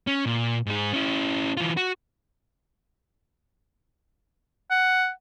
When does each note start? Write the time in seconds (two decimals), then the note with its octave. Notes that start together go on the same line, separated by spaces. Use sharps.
0.07 C#4
0.26 A#2
0.67 G#2 G#4
0.93 C#4 E4
1.57 E3 F4
1.77 F#4
4.70 F#5